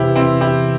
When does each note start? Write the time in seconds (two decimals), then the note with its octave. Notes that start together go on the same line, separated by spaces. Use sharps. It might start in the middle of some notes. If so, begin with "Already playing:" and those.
Already playing: E2 C3 E3 B3 E4 G4
0.16 C4 E4
0.41 E4 G4